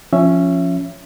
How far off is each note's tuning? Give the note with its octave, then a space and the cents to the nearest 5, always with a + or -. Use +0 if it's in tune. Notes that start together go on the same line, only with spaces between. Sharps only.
F3 +0 C#4 +0 E5 +20